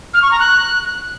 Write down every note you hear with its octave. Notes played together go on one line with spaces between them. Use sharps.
F6
C#6
A#5
F#6